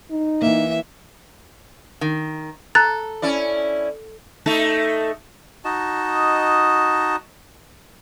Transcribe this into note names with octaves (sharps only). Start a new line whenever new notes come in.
D#4
E3 A#3 E5
D#3
A4 A#5 F#6 A6
C#4 E4 D5
A3 D#4 A4
D#4 F#4 D#5 A5